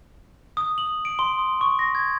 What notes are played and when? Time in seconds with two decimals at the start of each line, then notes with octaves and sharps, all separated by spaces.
0.57 D#6
0.78 F#7
1.05 D7
1.19 C6
1.39 D#6
1.61 C#6
1.79 A#6
1.95 G#6